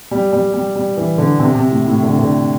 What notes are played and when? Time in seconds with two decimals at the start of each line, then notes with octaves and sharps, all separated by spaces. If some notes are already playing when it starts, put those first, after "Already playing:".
0.11 G3
0.32 G3
0.54 G3
0.75 G3
0.97 E3
1.18 D3
1.39 C3
1.55 C3
1.71 A2
1.87 A2
2.03 D3
2.19 D3